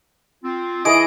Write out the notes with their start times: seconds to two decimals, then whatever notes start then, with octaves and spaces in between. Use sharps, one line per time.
0.43 C4 F4
0.85 E3 G#4 D#5 D7